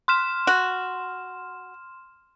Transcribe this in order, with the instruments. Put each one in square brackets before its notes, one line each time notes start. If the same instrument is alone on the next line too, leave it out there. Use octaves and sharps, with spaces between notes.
[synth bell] C6 F6 E7
[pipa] F#4